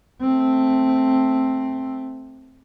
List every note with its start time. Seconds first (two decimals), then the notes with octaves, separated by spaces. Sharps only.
0.21 A3 C4